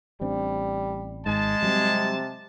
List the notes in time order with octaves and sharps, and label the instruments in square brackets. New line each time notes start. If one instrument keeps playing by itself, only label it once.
[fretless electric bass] A1 C4 D4 [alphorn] G3
[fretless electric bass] G#1 G#2 [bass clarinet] G#3 [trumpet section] A5
[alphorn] C3 [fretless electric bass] F#3 G3 C4